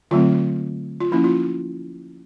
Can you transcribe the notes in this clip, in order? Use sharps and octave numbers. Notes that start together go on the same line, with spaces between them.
D3 F#3 A3 C4 F4
F4
F3 A#3 C#4 E4
F4